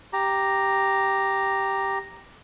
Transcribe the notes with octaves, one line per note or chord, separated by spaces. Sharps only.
G4 A#5